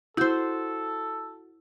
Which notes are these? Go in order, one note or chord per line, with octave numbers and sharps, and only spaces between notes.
E4 F#4 A4 C5 G6